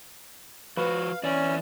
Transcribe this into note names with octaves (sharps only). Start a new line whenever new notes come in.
F3 F#4 B4 F5
E3 C#4 D5